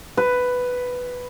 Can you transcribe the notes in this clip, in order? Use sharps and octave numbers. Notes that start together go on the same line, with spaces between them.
B4